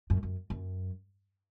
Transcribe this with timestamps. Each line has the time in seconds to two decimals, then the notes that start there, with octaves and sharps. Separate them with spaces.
0.10 F#2
0.23 F#2
0.50 F#2